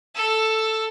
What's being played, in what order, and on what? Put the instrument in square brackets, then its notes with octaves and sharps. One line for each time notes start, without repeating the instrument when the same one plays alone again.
[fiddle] A4 E6